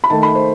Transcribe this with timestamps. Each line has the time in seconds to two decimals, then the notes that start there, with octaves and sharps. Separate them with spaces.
0.04 B5
0.10 D#3 A3 A5
0.23 B5
0.35 C5